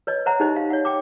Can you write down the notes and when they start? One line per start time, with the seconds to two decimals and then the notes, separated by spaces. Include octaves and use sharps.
0.07 B4 C#5 D#5
0.26 C5 E5 F#5 A#5
0.40 D#4 G4 C5 D#5
0.56 F5
0.70 C#5 F#5
0.85 G5 D6